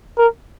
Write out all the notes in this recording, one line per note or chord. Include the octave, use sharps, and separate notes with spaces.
A#4